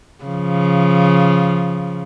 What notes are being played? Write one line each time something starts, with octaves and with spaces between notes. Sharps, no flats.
C#3 F3